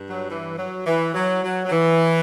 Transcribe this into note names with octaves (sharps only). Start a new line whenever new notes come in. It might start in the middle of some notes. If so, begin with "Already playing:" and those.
Already playing: G2
F#3
E3
F#3
E3
F#3
F#3
F#3
E3